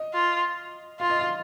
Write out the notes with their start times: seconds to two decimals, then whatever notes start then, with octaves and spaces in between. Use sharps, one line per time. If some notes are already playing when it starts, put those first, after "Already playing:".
Already playing: D#5
0.14 F4
1.00 F4 F5
1.10 D#5
1.19 F5